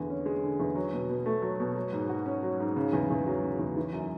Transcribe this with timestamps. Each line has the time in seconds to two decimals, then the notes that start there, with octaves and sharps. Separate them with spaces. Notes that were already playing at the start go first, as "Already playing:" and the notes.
Already playing: E2 D3
0.10 C#4
0.26 G#3
0.43 D3
0.60 E2
0.76 F#3
0.93 B2
1.09 B2
1.26 A3
1.42 F#3
1.60 B2
1.76 F#3
1.93 G#2
2.09 F#4
2.26 C#4
2.43 F#3
2.60 G#2
2.76 C#3
2.93 E2
3.10 E2
3.26 F#3
3.43 C#3
3.59 E2
3.77 E3
3.93 F#2